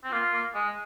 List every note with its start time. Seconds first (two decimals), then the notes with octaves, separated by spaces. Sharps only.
0.04 C4
0.12 A#3 F4
0.33 A#3
0.54 G#3